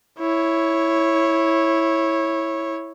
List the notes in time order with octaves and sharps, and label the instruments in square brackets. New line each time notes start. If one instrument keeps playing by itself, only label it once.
[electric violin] E4 C#5